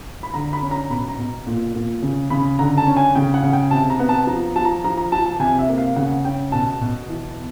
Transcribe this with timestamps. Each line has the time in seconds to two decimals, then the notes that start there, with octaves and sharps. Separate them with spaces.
0.23 B5
0.34 D3 A#5
0.53 B5
0.62 C#4
0.71 A#5
0.90 B2 B5
1.08 A#5
1.18 B2
1.47 A#2
1.75 A#2
2.02 C#3
2.30 C#3 B5
2.59 D3 A#5
2.78 A5
2.87 C#4
2.97 G#5
3.15 C#3 G5
3.34 F#5
3.43 C#3
3.53 G5
3.71 C3 A5
3.90 A#5
3.99 B3
4.09 A5
4.27 F3 A#5
4.56 F3 A5
4.65 A#5
4.84 F3 A#5
4.97 A#5
5.12 F3 A5
5.26 A5
5.40 C3 G#5
5.59 E5
5.68 A#3
5.78 F5
5.96 C#3 F#5
6.24 C#4 G5
6.52 B2 A5
6.81 B2
7.09 E3